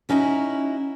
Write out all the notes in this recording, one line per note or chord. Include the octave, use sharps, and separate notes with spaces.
B3 C#4 D#4 E4 F#4 C#5